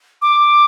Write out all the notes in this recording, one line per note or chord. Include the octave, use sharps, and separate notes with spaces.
D6